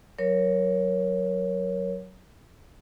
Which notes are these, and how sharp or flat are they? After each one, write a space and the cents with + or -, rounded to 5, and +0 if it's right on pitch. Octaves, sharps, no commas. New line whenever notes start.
F#3 +0 A#4 +15 C#5 +0